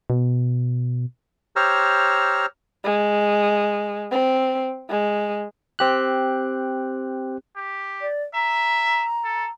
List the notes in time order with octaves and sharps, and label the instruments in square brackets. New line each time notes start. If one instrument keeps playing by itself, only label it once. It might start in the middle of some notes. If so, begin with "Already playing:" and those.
[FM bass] B2
[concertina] G4 C5 C#5 A#5 E6 F6
[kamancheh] G#3
C4
G#3
[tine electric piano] C4 G4 F#6
[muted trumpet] G4
[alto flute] D5
[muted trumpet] E5 [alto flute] A#5
[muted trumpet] A4